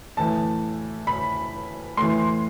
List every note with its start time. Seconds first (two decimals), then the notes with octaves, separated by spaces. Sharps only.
0.17 A2 E3 A5
1.07 B5
1.97 A2 E3 C6